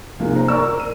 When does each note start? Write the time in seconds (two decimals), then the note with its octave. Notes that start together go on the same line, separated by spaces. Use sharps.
0.20 F1 F3 A#3 G#4
0.35 C5 A#5
0.48 A#4 D5 A#5 C#6 E6
0.65 A#4
0.80 D#7